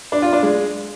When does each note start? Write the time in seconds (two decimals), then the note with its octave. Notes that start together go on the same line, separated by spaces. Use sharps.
0.12 D4
0.22 F4
0.33 D4
0.43 G#3